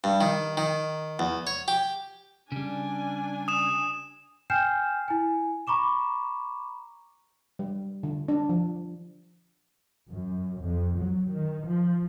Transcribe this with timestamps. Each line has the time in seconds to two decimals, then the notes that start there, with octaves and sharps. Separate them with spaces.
0.04 G2
0.21 D#3
0.57 D#3
1.19 E2
1.47 C#5
1.68 G4
2.52 C#3 G3 D4 G#5
3.48 D#6 E7
4.50 G5 G#5 F6 G6 C7 E7
5.08 E4 G#5
5.67 A#5 B5 C#6 D6 E7
7.59 G3
8.03 D3
8.28 D4
8.49 F3
10.10 F#2
10.62 F2
10.99 F#3
11.32 D#3
11.68 F3